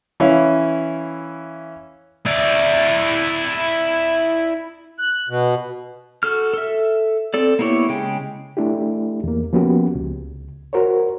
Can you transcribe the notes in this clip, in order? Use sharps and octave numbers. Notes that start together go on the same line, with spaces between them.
E3 C#4 E4 F5
E4 D5
F#6
B2
F#4 A4 F6
A4 E5
C4 A4 D5
A#3 B3 E4 G4 C#5
C#3 G#3 G5
A3 D4 E4 G4
E2 A#3
F3 A#3 B3 C#4 F#4 G4
C#2
F#4 A#4 C5 C#5